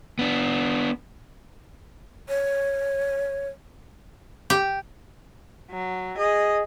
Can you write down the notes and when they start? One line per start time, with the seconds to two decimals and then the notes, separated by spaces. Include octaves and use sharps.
0.19 B3 D4
2.29 C#5
4.50 G4
5.71 F#3
6.18 G#4 D#5